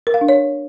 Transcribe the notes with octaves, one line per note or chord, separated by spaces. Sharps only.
A#4
F5
D4
C#5